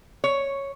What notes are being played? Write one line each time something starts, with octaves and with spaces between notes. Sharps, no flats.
C#5